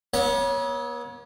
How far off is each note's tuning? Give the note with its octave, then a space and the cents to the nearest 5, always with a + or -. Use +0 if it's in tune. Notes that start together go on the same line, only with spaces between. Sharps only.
B3 -45 C#5 +0 E5 -45